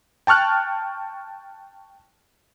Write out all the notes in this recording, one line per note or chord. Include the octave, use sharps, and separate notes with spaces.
G5 A5 C#6 F6 F#6